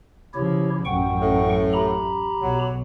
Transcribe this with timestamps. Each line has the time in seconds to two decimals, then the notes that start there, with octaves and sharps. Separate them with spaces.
0.34 C#3 F3 E4 G4 C#5
0.85 A1 F#2 F#5 G5 C#6
1.21 A2
1.73 G4 A#5 B5
2.41 B1 F#3